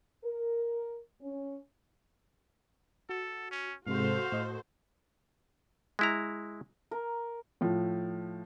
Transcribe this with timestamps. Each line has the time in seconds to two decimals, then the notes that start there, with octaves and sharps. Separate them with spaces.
0.24 A#4
1.21 C#4
3.09 F#4 A4
3.51 C#4
3.87 G#2 C3 G#3 F#4 A4 C5 F5
4.32 A2 D#5
5.99 G#3 E4 A#5
6.91 A#4
7.61 A2 F3